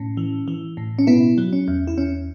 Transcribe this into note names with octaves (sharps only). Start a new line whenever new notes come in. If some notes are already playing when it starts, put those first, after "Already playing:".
Already playing: A2 C#4
E3
E3
A2
C#4
B2 B3 E4
F#3
C#4
E2
E4
E2 C#4